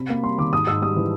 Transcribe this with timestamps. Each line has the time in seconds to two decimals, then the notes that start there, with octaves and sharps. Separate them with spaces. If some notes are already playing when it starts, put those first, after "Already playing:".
Already playing: C3 B5
0.09 A#3
0.23 G3 C6
0.38 D#3 D6
0.53 G#2 D#6
0.67 G#2 E6
0.82 G3 D#6
0.96 E3